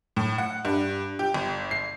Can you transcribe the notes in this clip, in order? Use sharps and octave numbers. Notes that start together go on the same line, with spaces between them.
A2
F#5
G2
G4
G1
C7